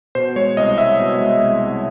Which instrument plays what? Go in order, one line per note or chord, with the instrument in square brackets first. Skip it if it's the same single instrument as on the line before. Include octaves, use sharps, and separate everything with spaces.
[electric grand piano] B2 C5
G#3 C#5
C2 D#5
C2 E5
B2
G#3
C2
C2